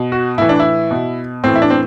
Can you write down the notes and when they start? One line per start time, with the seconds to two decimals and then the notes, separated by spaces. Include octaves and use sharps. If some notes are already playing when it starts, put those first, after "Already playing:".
Already playing: B2
0.12 F#4
0.38 A2 E3 E4
0.49 D4
0.60 E4
0.91 B2
1.44 A2 E3 C4
1.55 E4
1.62 D4
1.70 C4